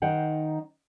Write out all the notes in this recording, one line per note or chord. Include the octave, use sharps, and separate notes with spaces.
D#3 D#4 C5 F#5 G5